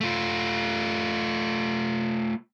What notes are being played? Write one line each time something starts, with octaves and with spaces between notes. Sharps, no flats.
A3 F4